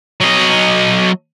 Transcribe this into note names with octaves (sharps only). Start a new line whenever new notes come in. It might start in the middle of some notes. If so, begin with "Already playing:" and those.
F#3 D#5